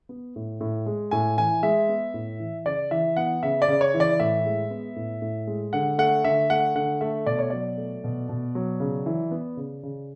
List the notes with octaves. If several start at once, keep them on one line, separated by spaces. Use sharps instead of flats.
B3
A2
A2
G#3
A2 G#5
E3 G#5
G#3 E5
B3
A2
E3
C#3 D5
E3 E5
B3 F#5
C#3 E5
D5
C#3
C#5
E3
D5
A2 E5
G#3
B3
A2
A2
G#3
D3 F#5
A3 F#5
D3 E5
A3 F#5
D3 F#5
A3 E5
B2 D5
C#5
F#3 D5
A3
B2
B2
F#3
C#3
E3
B3
C#3
C#3